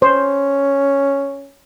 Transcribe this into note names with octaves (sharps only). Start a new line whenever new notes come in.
C#4 C5